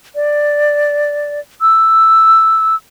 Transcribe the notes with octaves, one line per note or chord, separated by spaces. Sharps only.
D5
E6